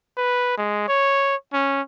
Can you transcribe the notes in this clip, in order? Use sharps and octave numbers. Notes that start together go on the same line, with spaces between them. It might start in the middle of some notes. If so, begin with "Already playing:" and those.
B4
G#3
C#5
C#4